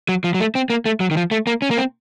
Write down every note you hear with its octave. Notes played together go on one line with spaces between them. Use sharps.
F#3
F3
F#3
A3
C4
A#3
A3
F#3
D#3
F3
A3
A#3
C#4
A#3
C4